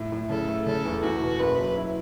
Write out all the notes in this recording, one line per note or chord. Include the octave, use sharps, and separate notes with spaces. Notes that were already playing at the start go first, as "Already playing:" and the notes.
Already playing: A2
A2
C#3 A4
A3
C#3 A4
E2
E2 F#4
B2
F#1 B4
F#3
E4